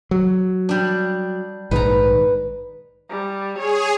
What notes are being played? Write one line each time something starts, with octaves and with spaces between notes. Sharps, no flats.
F#3
G3 D4
A#1 G#2 D#3 B4 A#5
G3
G#4 C#5